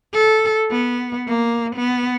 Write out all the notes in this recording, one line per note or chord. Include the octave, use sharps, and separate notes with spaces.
A4
B3
A#3
B3